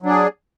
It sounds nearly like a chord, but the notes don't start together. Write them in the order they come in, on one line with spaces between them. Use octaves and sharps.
F#3 D4 G#4